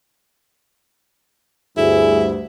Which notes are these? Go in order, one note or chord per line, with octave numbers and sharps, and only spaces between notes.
D2 G2 E4 G#4